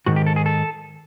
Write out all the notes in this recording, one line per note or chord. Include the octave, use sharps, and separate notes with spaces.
G#2 D#3 F#4
G4
A4
G#4
A4